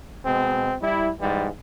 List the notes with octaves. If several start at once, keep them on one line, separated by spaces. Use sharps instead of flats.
B2 G#3 C4
G3 E4
G#2 E3 G3